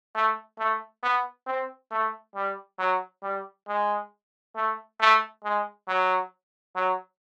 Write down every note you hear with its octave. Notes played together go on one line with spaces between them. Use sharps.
A3
A3
B3
C4
A3
G3
F#3
G3
G#3
A3
A3
G#3
F#3
F#3